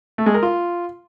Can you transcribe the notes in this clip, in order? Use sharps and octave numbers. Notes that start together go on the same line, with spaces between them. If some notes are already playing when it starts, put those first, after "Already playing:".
A3
G#3
A#4
F4